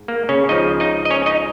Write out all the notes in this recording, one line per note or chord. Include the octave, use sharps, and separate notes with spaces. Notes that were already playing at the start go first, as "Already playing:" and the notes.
Already playing: G#2
A#3
C#3 C#4
C#2 C#3 F3 D#4 D#5
D#4 D#5
D#5
C#4 C#5
D#4 D#5